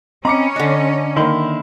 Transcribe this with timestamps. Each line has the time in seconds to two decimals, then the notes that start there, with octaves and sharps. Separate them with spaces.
0.25 C4 C#4 D#5 A#5 B5 D6 C#7
0.56 D3 D4 D#5
1.16 D#3 A#3 E4 B5 C6